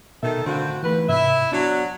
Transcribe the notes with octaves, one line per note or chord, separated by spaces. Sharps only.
B2 D#3 A4 E5
A2 D3 C4 F#4 F5 G6
D#2 E3 A3 B4
G#2 C3 E4 E5
F#3 B3 D4 F#4